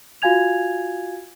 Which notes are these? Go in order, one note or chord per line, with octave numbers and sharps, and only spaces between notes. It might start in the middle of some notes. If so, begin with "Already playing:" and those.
F4 F#4 F5 G#5 G#6 F7